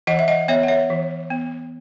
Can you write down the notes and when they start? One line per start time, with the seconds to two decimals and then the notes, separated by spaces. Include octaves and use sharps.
0.07 E3 D#5 F#5
0.19 E5
0.28 D#5 F#5
0.48 B3 C#5 E5
0.63 F#5
0.68 C#5 E5
0.90 E3
1.30 B3